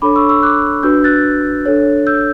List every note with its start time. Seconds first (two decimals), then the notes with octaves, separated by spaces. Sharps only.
0.02 D4 A4 C#5 B5 D6
0.16 C#6 E6
0.29 C#6 E6
0.43 D6 F#6
0.83 D4 F#4 B4 E6 G6
1.04 F#6 A6
1.66 D4 A4 C#5
2.07 E6 G6